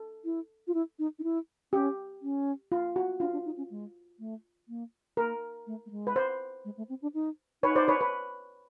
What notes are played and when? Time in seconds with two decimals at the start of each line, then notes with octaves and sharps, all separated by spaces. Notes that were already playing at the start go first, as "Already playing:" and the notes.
Already playing: A4
0.25 E4
0.67 F4
0.74 E4
0.99 D#4
1.19 D#4
1.24 E4
1.73 C#4 G4
2.22 C#4
2.72 F4
2.96 F#4
3.20 D4 F4
3.33 D4
3.45 D#4
3.58 C#4
3.70 G#3
4.19 A3
4.68 A#3
5.17 A#3 A#4
5.67 A3
5.86 A3
5.91 G#3
6.07 B4
6.16 C5
6.65 G#3
6.77 A3
6.89 C4
7.02 D4
7.14 D#4
7.63 D#4 B4 C#5
7.76 C5 D5
7.88 B4 C#5
8.01 B4